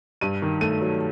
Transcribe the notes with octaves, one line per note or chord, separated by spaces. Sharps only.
G2 D#7
D#3
A3 D#7
F#3